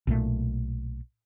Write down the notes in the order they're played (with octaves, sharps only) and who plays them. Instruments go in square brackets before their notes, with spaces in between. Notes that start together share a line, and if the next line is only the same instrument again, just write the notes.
[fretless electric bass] B1 A#2 A3